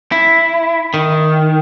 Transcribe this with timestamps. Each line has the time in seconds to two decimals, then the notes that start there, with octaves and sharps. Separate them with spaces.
0.12 E4
0.94 D#3